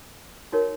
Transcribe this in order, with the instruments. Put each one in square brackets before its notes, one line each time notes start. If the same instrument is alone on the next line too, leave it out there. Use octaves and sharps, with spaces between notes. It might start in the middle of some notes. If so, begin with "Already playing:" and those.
[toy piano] D#4 F#4 A#4 C#5